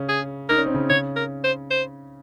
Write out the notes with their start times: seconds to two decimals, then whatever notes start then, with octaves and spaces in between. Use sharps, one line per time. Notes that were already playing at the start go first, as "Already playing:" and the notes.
Already playing: C#3 C#4
0.09 G#4
0.49 D#4 A#4
0.58 C#4
0.66 C4
0.74 C#3 C#4
0.90 C#3 C#4 C#5
1.16 A#4
1.44 C5
1.71 C5